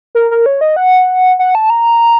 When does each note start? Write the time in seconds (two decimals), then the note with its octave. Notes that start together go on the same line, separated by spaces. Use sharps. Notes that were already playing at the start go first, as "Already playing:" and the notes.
0.15 A#4
0.31 A#4
0.46 C#5
0.61 D#5
0.76 F#5
1.39 F#5
1.55 A5
1.70 A#5